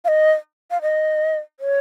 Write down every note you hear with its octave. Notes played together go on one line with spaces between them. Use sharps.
F5
D#5
F5
D#5
C#5